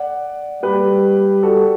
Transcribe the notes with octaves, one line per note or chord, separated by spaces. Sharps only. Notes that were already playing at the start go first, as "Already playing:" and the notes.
Already playing: D5 F#5
G3 G4 B4
F#4 A4